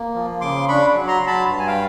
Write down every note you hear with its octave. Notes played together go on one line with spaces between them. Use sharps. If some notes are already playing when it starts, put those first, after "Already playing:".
Already playing: A#3
F3
C#3 C6 D6
D4 B5 C#6
F#3
A#5 C6
F#3
A5 B5
G2 A5
G#5
F5 G5